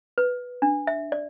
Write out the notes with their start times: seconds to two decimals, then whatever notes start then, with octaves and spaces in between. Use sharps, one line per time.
0.18 B4
0.62 D4
0.87 E5
1.12 D5